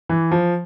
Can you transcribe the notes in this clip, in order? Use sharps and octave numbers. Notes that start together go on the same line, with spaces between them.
E3
F3